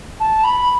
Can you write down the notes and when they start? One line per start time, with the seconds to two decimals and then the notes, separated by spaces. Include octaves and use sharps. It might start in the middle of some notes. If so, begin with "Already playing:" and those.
0.20 A5
0.44 B5